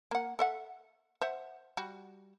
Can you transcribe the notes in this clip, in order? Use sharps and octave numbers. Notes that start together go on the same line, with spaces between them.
A#3 F#5
A4 E5 F#5
C5 E5 F#5
G3 F#4